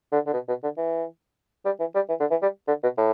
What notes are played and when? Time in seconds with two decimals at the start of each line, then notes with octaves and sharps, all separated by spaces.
0.12 D3
0.27 D3
0.33 B2
0.48 B2
0.63 D3
0.78 E3
1.65 G3
1.80 E3
1.95 G3
2.09 E3
2.20 D3
2.31 E3
2.42 G3
2.67 D3
2.83 B2
2.98 A2